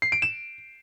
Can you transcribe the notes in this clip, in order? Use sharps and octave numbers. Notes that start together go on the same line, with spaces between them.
C7
D7
E7